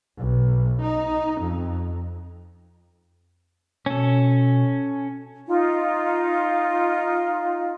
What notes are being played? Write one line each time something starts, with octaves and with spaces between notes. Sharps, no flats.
B1
D#4
F2
B2 C#4 A4
D#4 F4